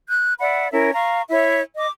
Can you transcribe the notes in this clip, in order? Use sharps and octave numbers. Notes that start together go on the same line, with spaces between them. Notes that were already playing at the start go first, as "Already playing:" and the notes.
F#6 G6
D5 E5 F#5 B5
C#4 E4 A#4 E5
F5 A#5 C#6
E4 C#5 E5
D#5 D6